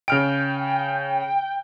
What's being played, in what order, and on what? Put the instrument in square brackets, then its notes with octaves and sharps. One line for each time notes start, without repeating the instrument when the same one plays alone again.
[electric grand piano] C#3 F6 D7 [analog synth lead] G5